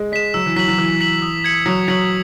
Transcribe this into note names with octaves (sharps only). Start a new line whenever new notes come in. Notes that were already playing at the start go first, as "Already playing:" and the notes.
Already playing: G#3
G#3 B6 E7
F#3 E6
E3
F#3 B6 F#7
F#3
E3 E6
B6 F#7
D#6
G#6 C#7 F#7
F#3 D#6
F#3 G#6 C#7 F#7